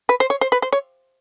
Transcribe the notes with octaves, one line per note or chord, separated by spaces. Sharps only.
B4
C5
C#5
C5
B4
C5
C#5